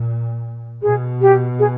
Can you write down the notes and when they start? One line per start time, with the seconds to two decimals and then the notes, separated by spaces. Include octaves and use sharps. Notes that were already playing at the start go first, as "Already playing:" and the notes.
Already playing: A#2
0.82 B2 G#4
1.21 G4
1.59 G#4